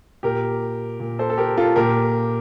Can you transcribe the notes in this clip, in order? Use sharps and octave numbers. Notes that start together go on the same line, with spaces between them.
A#2 G4 A#4
A#2
A4 C5
A4
G4 A#4
F4 A4
A#2 G4 A#4